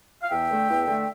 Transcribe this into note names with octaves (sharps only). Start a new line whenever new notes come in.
F5
E2 E5 G5
D3 A3
E2
D3 A3